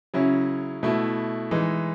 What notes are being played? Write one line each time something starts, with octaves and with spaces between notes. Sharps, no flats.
C#3 F#3 C#4 E4
B2 A3 E4
E3 G#3 D#4